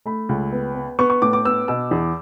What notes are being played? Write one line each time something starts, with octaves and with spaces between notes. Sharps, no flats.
A3 B5
C#2
B3
B3
B3 C#6
C#6
A2 D6
D6
B3 E6
B2 E6
E2